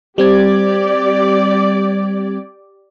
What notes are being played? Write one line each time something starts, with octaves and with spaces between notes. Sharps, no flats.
G3 C4 G4 D5 G#6